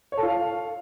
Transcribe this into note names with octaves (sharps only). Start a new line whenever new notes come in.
C#5
A4
F4
F5